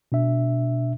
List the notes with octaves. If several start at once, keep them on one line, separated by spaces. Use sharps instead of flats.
B2 D4 E5